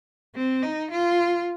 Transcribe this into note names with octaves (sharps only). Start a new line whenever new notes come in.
C4
D#4
F4